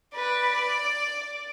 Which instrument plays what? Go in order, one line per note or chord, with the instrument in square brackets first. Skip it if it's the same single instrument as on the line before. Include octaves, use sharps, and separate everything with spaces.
[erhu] B4 [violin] D5